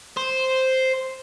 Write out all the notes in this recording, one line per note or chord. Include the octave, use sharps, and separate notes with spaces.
C5